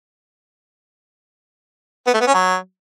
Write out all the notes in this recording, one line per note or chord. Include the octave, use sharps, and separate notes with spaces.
B3
A3
B3
C#4
F#3